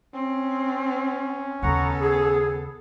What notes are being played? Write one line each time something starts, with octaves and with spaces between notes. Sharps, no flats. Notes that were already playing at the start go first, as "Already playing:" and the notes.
C4 C#4
D#2 C#3 B3 A4 F#5 A#5 C#6
G#4